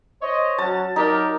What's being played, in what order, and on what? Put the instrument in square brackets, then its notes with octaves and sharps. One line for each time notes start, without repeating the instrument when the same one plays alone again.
[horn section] C5 C#5 D#5
[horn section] F#3 C#4 F#4 [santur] A5
[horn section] F#3 G4 A#4 [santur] D#4